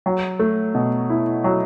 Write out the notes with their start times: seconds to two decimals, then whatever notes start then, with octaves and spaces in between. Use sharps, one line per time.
0.06 F#3
0.39 A3
0.74 B2
1.10 E4
1.44 F#3